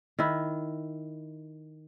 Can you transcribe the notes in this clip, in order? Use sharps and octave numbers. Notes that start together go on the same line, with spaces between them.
D#3 E4